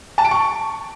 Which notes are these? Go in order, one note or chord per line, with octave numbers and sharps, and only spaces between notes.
A5
D7
C#6